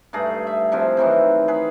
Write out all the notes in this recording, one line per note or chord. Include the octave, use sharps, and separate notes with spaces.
G2 A3 G#4 A#5
E5
C3 F3 E4 F#4
D#3 E3 F#3 C4
G#4 B4